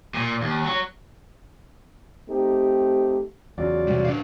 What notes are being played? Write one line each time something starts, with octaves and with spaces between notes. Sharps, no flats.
A#2
D#2
F#3
A3 C4 D#4 G4
E2 C#3 F#3 F4 D5
C3 G3
D4 F5